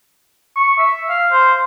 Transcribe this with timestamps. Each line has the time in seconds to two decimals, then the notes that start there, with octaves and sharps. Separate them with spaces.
0.56 C#6
0.78 E5
1.09 F5
1.32 C5